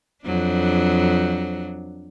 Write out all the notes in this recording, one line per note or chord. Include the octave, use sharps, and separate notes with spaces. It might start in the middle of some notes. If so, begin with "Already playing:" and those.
F2 F#3 D4